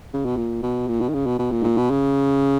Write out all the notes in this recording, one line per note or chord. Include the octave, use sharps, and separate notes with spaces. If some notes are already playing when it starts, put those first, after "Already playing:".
C#3
B2
A#2
B2
A#2
B2
D#3
C#3
B2
B2
A#2
G#2
A#2
B2
C#3